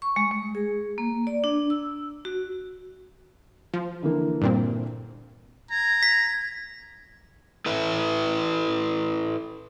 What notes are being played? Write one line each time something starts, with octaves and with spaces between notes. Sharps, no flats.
C#6
G#3
G#3
G#4
A#3
D5
D4
E6
F#4
F3
D3 E3 A#3
G2 A#2 C4
A#5 G#6
B6
E4 A4 B4 E5